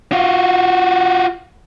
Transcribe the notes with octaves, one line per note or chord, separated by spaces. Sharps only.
F4 F#4